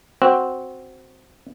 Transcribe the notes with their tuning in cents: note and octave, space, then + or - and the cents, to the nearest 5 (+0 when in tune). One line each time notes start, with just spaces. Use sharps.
C4 +0 F#4 +0